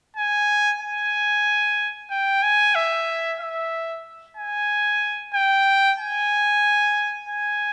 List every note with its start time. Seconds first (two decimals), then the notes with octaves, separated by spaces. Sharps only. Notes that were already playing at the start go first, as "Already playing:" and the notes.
0.16 G#5
0.81 G#5
2.10 G5
2.43 G#5
2.75 E5
3.40 E5
4.37 G#5
5.34 G5
5.99 G#5
7.29 G#5